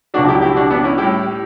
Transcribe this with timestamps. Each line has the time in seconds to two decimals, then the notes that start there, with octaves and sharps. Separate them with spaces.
0.14 C#2 B2 F#3 D4 F#4
0.29 E4 G4
0.42 E4 G4
0.56 D4 F#4
0.70 B3 D4
0.84 C#4 E4
0.98 A2 G3 E4 G4